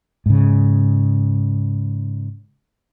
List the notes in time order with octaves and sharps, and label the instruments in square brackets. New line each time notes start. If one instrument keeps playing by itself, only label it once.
[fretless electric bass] G#2 C#3